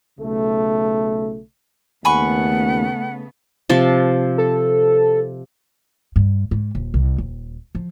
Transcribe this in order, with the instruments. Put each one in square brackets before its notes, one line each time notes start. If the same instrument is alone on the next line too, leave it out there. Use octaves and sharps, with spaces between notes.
[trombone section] B1 C#3 A3
[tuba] D#2 [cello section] C#3 A3 B3 [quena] F#5 [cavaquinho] G#5 B5 C#6
[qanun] C3 F3 A5
[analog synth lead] A4
[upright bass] G2
G#2
D#1
C2
D#1
F3